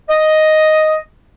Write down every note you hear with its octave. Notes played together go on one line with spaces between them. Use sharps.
D#5